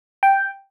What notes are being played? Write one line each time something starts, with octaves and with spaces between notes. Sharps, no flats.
G5